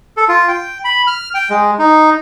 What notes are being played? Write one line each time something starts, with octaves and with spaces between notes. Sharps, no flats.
A4
F4
G5
B5
F6
G5
G#3
D#4